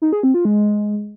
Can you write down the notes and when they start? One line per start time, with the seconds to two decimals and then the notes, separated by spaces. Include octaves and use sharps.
0.02 D#4
0.13 G#4
0.23 C4
0.34 F4
0.45 G#3